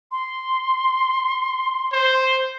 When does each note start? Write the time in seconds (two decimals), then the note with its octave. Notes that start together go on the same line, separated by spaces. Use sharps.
0.12 C6
1.92 C5